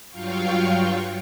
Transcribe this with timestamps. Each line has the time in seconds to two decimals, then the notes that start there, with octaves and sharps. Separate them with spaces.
0.10 G2 F#3 F4 F5 G5 C#6